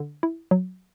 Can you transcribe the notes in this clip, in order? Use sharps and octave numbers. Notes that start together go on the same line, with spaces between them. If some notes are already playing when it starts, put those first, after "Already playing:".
Already playing: D3
E4
F#3